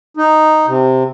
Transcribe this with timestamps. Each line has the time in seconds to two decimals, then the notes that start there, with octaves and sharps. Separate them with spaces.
0.17 D#4
0.67 C3